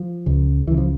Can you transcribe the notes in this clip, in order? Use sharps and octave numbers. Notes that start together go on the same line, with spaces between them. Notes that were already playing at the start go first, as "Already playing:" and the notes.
Already playing: F3
C#2 C#3
C#2 C#3 E3
F3